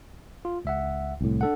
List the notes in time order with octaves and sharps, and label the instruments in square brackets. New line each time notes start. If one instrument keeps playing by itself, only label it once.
[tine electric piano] F4
C#2 E5 F#5
[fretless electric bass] C2 A2
[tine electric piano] D4 A4 F#5